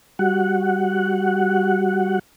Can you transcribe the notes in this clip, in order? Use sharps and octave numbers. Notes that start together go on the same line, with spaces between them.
G3 F#4 F#5